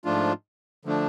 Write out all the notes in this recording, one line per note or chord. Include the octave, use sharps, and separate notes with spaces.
G#2 F3 A3 D4 F4
D3 F3 A3 D4